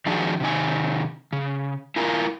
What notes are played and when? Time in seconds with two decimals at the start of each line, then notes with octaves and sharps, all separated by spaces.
0.06 D#3 F3 D4 F#4 G#4
0.40 C3 D#3 G#5
1.33 C#3
1.96 E4 F4 A#4 G#5